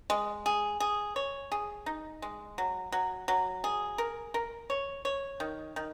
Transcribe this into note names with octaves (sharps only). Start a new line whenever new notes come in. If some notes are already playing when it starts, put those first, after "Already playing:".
G#3
G#4
G#4
C#5
G#4
D#4
G#3
F#3
F#3
F#3
G#4
A#4
A#4
C#5
C#5
D#3
D#3